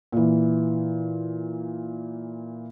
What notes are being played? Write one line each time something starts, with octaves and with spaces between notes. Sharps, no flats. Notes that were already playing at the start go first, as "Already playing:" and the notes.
A#2 E3